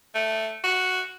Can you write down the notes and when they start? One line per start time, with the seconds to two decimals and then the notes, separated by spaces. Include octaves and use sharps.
0.15 A3
0.64 F#4